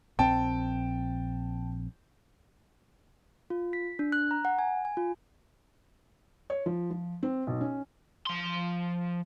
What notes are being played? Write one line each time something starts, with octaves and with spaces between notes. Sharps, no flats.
A#1 C4 G5 A5
F4
B6
D4
F#6
A#5
F#5
G#5
G#5
F4
C#5
F3
F3
C4
B1
C#4
F3 C6